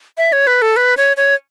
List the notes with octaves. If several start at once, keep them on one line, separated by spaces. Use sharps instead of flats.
E5
C#5
B4
A4
B4
C#5
C#5